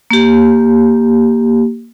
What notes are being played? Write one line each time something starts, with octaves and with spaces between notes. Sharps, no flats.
A#3 G4